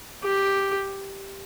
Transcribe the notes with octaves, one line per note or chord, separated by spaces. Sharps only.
G4